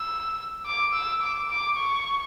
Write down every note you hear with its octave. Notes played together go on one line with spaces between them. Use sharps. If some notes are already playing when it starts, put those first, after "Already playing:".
Already playing: E6
D6
E6
D6
D6
C#6